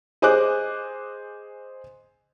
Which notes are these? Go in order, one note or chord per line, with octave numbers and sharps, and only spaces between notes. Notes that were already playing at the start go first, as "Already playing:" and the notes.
G#4 C5 D#5 G#5 D6 F#6